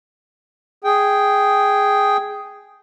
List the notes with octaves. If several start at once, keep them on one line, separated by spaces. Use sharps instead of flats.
G#4 G5